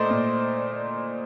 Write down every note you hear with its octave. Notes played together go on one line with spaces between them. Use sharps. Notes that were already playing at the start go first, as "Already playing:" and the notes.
Already playing: A#2 A3 C5 D5 D#5
A#2